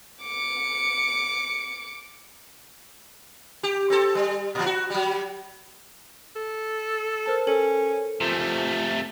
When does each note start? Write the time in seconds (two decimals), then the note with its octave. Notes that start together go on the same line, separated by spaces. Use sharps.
0.23 D6 C#7
3.63 G4
3.90 C4 A4
4.15 G3
4.55 A#2 F3
4.66 F#4
4.90 F#3 G3
6.36 A4
7.26 A#4 C5 A5
7.47 C#4 A4
8.21 C3 F3 A3